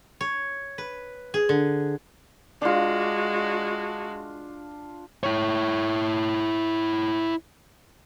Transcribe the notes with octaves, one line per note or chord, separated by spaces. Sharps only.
C#5
B4
G#4
D3
G#3 D4 F4 F#4
E4 C#5